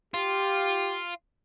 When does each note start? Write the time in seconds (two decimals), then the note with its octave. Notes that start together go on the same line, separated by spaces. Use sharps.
0.14 F4 G4